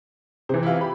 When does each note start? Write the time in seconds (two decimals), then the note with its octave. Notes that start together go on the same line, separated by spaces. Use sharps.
0.49 C3 E3 C5
0.63 E4 F4
0.81 G4 B5